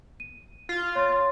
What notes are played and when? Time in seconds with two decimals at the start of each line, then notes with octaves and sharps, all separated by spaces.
0.20 D#7
0.69 F4
0.95 C#5 C6 A6